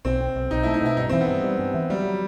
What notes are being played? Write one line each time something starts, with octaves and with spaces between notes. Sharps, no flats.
B1 C4
C4
B1
B1 D#4
E4
A3
D#4
B2 E4
G2 D#4
C4
E3
B3
G2
G3
G2
E3
F#3 G3
F#3